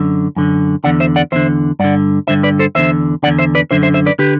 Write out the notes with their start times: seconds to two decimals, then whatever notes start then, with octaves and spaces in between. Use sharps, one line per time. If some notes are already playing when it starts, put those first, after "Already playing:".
Already playing: F#2 D3
0.36 F#2 D3
0.84 E2 D3 D5 F#5
1.00 C5 E5
1.16 D5 F#5
1.32 E2 D3 C5 E5
1.79 G2 D3 D5 F#5
2.28 G2 D3 C5 E5
2.43 B4 D5
2.59 A4 C5
2.75 E2 D3 C5 E5
3.23 E2 D3 D5 F#5
3.39 C5 E5
3.55 B4 D5
3.71 F#2 D3 C5 E5
3.83 C5 E5
3.94 C5 E5
4.06 B4 D5
4.19 D3 G4 B4